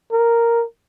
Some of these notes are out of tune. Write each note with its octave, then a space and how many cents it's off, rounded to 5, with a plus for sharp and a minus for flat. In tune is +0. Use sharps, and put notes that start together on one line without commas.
A#4 +0